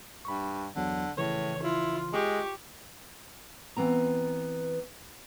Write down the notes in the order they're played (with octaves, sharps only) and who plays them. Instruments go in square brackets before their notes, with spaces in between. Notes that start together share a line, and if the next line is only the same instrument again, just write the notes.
[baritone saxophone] G2 [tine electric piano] B5 C#6
[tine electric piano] G1 E2 F#3 [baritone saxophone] D3
[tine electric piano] A#1 C#3 E3 [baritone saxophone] A2 [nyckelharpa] C#5
[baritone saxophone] E4 [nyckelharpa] F4
[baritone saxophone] G#3 [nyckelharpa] G4 C#6
[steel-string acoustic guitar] E3 B3 C4 A#5